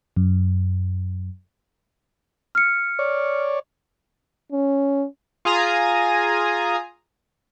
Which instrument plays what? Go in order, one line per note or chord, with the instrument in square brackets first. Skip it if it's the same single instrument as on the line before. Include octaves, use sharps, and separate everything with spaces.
[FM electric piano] F#2
[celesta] F6 C#7
[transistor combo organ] C#5 D5
[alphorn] C#4
[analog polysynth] F4 G#4 G#5 A#5 D#6